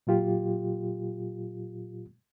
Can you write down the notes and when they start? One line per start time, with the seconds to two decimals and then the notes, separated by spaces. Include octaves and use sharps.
0.07 A#2 F#3 F4 G4